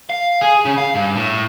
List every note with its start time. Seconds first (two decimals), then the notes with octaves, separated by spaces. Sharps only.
0.09 F5
0.41 G#4
0.65 C#3
0.78 F5
0.95 G2
1.16 A2